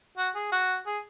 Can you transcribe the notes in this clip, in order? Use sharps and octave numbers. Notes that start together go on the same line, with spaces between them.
F#4
G#4
F#4
G#4